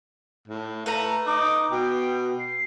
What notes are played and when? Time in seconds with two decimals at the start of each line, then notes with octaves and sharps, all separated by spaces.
0.48 A2
0.86 A3 B4 A#5
1.27 D#4 D6
1.71 B2 G5
2.40 C7